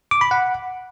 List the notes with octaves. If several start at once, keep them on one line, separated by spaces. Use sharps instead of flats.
D6
B5
F#5